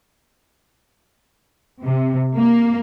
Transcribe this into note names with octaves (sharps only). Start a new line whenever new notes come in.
C3
A#3